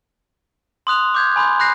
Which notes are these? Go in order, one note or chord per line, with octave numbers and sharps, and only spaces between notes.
C6 D#6 F#6 F7
D6 G6 G#6
G#5 B5 C6 G6
B5 F#6 G6 A#6 C7